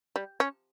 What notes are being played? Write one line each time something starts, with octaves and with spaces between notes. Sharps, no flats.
G3
C#4